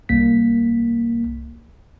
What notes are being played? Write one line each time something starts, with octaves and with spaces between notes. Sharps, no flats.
C2 A#3 B6